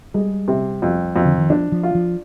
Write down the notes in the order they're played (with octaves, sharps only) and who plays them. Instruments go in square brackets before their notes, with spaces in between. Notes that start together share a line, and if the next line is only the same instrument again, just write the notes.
[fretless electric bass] G3 [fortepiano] G#3
[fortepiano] C3
F2
F2
[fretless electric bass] D3
D#3
[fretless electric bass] F3 [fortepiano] D4
[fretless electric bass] F3
[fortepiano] F4
[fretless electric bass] F3